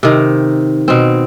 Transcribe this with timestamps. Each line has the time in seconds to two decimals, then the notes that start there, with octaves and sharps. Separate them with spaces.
0.03 C3 D#3
0.88 B2 C4